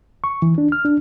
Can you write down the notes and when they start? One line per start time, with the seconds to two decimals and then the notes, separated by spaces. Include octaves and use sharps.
0.24 C#6
0.42 E3
0.58 D4
0.72 F6
0.85 D4